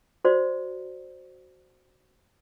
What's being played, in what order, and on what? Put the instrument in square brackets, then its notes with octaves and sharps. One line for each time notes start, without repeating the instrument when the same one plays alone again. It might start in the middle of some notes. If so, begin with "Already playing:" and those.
[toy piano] F#4 C5 D5